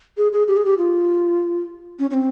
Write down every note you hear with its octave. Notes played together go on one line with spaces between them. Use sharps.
G#4
G#4
G4
G#4
G4
F4
C#4
C#4
C4